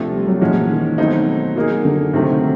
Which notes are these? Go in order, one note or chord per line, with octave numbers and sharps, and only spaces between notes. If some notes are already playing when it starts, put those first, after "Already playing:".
Already playing: C3 F3 A3 D4 F4
G3
F#3
A#2 E3 F3 G#3 C#4 F#4
D#3
B2 F#3 A3 C4 D#4
F#3 A#3 D#4 G#4
D3
C3 D#3 F#3 A3 C4